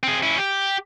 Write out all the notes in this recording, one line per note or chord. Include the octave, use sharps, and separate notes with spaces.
C4 G#4
C#4 E4
G4